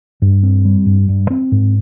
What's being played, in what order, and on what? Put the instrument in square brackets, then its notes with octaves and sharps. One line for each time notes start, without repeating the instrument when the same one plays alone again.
[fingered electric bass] G2
C4
G3
G2
G2
C4
G#2